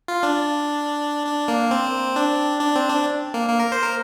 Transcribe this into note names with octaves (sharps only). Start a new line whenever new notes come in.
F4
D4
D4
A#3
C4
D4
D4
C4
D4
A#3
A#3
A#4
C5
A#4